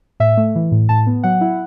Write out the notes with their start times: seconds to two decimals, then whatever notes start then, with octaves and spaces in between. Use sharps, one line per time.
0.20 A2 E5
0.37 A3
0.56 E3
0.72 A2
0.89 A2 A5
1.07 B3
1.23 F#3 F#5
1.41 E4